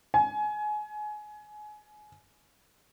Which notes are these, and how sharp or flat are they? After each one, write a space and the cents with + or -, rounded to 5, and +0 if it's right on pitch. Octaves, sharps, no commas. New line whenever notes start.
G#5 +25